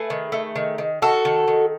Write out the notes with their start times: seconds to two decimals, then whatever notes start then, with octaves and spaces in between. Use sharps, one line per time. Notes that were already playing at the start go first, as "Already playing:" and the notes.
Already playing: A3 G#4 B4
0.10 D#3
0.32 A3
0.56 D#3
0.78 D#3
1.02 D#3 F#4 A4
1.25 D#3
1.48 D#3